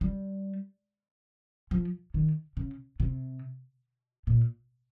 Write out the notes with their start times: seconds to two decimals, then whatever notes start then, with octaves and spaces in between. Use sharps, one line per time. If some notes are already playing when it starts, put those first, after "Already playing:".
0.01 G3
1.71 F3
2.14 D#3
2.57 C#3
3.00 C3
4.27 A#2